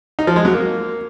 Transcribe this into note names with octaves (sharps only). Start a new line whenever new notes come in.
D#4
F3
G#3
F#3
A#3